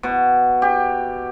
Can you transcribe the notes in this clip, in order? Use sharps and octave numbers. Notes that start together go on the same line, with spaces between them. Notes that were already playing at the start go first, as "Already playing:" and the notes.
B2
G4